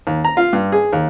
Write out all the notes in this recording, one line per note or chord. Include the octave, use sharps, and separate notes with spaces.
D#2
A#5
F4
G2
G#4
D#2